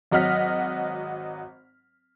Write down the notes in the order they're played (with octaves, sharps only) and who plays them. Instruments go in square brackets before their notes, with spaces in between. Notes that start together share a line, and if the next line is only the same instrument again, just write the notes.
[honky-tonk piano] G#1 F#3 D#5 F#5 F6 B6